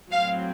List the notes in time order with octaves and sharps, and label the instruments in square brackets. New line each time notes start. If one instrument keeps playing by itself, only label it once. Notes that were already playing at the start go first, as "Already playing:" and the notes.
[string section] A2 F#3 C4 F5